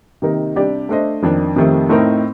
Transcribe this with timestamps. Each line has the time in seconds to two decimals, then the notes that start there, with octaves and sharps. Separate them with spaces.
0.22 C3 D#3 A#3 D#4 A#4
0.56 C3 G3 D4 G4 D5
0.89 A3 D4 A4 C5 D#5
1.22 F2 D#3 A#3 D4
1.56 F2 C3 D#3 A3
1.89 A2 A3 C4 D#4 A#4